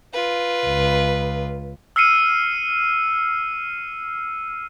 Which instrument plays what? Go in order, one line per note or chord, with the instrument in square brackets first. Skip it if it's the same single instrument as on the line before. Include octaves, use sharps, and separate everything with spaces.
[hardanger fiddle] F4 B4
[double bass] C#2
[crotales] E6 F6 C7 C#7 D#7